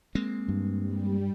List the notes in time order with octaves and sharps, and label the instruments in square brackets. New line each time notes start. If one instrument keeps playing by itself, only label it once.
[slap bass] G#3 A#3 C4
[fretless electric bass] G2
[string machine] G3